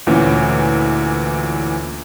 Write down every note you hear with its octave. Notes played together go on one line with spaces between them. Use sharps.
D2 A#2 E3 C#4